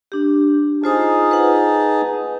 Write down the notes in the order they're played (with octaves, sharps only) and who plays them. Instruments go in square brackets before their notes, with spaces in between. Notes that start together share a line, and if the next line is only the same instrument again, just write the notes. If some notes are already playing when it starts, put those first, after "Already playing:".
[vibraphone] D4 G4
[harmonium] D#4 G#4 A5 [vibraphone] F4 C5 D#6
[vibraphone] B4 F#5